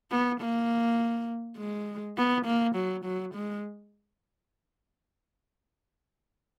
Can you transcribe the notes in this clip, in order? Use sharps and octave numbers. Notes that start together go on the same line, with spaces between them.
B3
A#3
G#3
B3
A#3
F#3
F#3
G#3